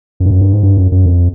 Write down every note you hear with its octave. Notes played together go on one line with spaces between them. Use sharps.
F#2
G2
F#2
G2
G#2
G2
F#2
F#2
F2